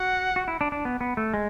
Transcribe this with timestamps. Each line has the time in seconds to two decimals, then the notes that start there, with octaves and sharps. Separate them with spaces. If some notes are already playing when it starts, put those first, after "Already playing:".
Already playing: F#4 F#5
0.36 F#4
0.48 E4
0.61 D4
0.72 D4
0.85 B3
1.01 B3
1.17 A3
1.34 G#3